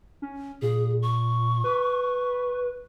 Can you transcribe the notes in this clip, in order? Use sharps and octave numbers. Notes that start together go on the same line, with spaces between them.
C#4
A#2 G#4
C#6
B4